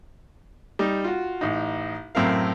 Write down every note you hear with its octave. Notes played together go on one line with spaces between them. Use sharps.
G3 D#4
F4 F#4
A1 D#4
F#2 A2 C4 E4 A#4 F5